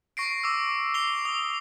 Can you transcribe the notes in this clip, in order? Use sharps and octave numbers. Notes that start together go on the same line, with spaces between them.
C#6 A#6 C7 D7
D6 E6
C7 F7 G7
D#6